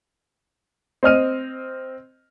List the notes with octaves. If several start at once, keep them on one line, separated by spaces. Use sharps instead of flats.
C4 D#5 F6 D#7